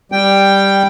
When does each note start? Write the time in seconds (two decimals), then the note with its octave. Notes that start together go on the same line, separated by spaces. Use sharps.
0.12 G3 G5